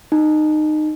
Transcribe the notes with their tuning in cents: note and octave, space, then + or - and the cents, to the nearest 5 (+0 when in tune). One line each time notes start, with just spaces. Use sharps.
D#4 -20